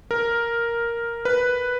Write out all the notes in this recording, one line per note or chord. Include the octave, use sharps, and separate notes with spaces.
A#4
B4